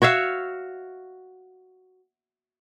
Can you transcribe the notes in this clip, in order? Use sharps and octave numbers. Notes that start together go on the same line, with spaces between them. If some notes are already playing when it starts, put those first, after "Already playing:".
F#4 C#5 E5 F5